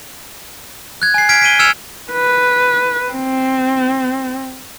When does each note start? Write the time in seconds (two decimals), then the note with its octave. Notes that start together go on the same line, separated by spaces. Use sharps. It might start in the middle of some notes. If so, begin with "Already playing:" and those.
1.02 F#6 G#6
1.14 G#5 C7
1.29 F6 G#6 B6 D7
1.41 B6 D7 D#7 G7
1.59 E6 F6 G#6 C#7 E7 F7
2.13 B4
3.12 C4